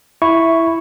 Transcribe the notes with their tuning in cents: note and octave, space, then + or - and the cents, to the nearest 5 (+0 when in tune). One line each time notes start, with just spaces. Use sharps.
E4 +0 C#6 +0